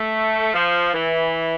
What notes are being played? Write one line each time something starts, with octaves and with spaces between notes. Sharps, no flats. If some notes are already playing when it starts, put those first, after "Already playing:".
Already playing: A3
F3
E3